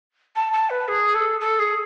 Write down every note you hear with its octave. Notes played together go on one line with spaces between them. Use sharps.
A5
A5
B4
G#4
A4
A4
G#4